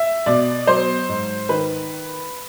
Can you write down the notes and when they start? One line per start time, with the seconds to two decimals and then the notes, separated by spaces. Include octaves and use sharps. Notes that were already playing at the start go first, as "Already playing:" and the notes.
Already playing: E5
0.26 B2 D5
0.67 F#3 C5
1.09 G#2
1.49 D#3 B4